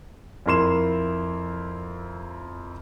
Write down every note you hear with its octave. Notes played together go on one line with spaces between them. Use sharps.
F2 E4 A#4 C6 E7